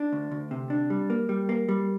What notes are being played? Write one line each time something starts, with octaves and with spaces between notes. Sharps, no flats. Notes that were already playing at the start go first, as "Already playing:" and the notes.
Already playing: D4
D2
D2
C3
D4
G3
A#3
G3
A#3
G3